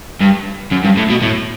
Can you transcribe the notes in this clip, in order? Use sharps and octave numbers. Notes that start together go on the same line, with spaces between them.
G2
F#2
G2
A2
B2
A2